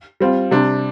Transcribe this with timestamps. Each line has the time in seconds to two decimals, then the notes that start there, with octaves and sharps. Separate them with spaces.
0.20 G3 C4 F4
0.51 C3 G3 D4